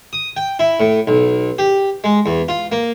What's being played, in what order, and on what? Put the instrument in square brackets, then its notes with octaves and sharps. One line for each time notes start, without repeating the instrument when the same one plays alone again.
[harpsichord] D#6
G5
E4
A2
B1
G4
G#3
E2
F4
A#3